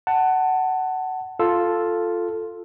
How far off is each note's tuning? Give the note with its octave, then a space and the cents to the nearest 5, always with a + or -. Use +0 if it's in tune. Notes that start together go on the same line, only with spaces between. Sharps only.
F#5 +15 A5 +15
F4 +0 A4 +0